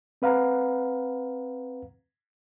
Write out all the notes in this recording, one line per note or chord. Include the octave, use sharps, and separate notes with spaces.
C4 B4 F5 F#5 A#5